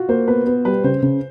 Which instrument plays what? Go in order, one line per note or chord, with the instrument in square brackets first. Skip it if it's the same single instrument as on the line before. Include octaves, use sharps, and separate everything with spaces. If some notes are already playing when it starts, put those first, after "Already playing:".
Already playing: [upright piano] F4 F#4
[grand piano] A#3 [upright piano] C5
[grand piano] B3 [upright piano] B4
[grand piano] B3
[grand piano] G3 [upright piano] B4
[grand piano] C#3 [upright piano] C5
[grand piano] C#3